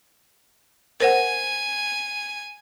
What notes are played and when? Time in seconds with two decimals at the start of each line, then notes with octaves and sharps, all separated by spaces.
1.00 A#4 C5 F#5 G#5